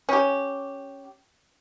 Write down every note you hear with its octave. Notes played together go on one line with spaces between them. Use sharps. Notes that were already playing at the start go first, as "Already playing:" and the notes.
C#4 G4